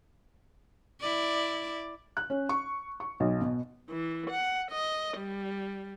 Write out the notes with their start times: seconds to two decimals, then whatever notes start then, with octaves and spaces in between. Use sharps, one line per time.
1.01 E4 D5
2.17 F#6
2.30 C#4
2.49 C#6
3.00 C#6
3.20 B1
3.41 B2
3.90 E3
4.30 F#5
4.70 D#5
5.18 G3